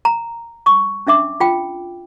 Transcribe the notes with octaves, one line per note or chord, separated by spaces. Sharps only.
A#5
C#6 D#6
C#4 D4 E5 D6
F4 G5